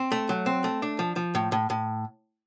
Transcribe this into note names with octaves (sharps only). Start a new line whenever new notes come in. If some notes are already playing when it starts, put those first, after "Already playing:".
Already playing: C4
A3
F#3
C4
A3
D4
F3
F3
A2
A2
A2